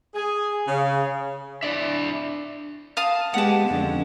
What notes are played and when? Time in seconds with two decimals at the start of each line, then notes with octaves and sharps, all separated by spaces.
0.15 G#4
0.68 C#3
1.63 D4 E4 D5 E5
2.97 F5 A5 D#6
3.34 G#3 B3 G4 F#5 A5
3.69 F2 D3 C#4